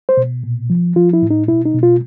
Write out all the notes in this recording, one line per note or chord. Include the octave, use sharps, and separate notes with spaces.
C5
B2
A#2
F3
F3 F4
E4
A2
D#4
B2 E4
D#4
B2
F4